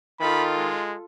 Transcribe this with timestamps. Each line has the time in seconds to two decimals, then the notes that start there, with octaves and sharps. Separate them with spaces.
0.20 D#3 F4 A4 B5
0.57 G#3